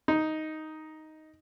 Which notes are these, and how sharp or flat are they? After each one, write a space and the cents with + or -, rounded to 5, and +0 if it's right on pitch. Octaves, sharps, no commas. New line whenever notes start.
D#4 +5